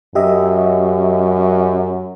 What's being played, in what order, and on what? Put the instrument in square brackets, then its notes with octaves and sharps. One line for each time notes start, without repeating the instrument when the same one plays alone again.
[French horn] F#2 [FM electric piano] G4 D#5 E5